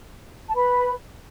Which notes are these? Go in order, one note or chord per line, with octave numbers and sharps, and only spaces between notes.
A5
B4 B5